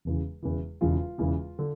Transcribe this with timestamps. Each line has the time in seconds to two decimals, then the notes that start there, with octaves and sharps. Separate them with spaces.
0.05 E1 E2 C#3 E3
0.42 E1 E2 C#3 E3
0.81 E1 E2 C#3 E3 F4
1.18 E1 E2 C#3 E3
1.59 D3